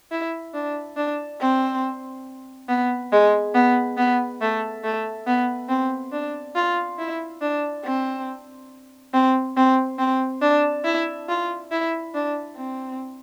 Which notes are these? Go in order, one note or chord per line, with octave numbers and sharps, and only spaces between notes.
E4
D4
D4
C4
B3
G#3
B3
B3
A3
A3
B3
C4
D4
F4
E4
D4
C4
C4
C4
C4
D4
E4
F4
E4
D4
C4